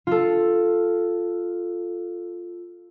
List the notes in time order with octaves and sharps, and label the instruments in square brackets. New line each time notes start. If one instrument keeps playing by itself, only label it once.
[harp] F4 A4